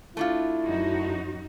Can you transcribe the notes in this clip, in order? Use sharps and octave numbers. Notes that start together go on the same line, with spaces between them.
A3 D4 E4 F4
F#2 D#4 F#4